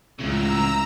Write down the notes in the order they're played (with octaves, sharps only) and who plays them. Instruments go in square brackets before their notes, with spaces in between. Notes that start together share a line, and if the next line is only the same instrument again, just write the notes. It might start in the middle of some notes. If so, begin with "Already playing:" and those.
[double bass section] C#2 [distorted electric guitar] A2 C#3 [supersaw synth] A#5 E6